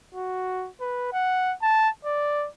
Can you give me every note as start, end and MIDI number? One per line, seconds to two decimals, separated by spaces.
0.15 0.69 66
0.81 1.12 71
1.13 1.54 78
1.62 1.89 81
2.05 2.48 74